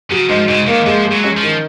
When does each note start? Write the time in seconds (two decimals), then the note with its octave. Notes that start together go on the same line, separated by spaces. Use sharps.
0.10 C#3 F#3
0.29 G#2 F3
0.48 G#2 C#3
0.67 D#3 A#3
0.86 F3 G#3
1.05 G#3
1.11 F#3
1.24 C#4
1.37 F3
1.43 D#3